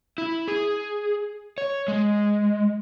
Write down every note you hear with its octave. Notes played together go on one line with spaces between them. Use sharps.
E4
G#4
C#5
G#3